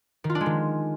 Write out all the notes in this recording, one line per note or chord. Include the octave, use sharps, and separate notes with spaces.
D#3
F4
D4
G#3
D#3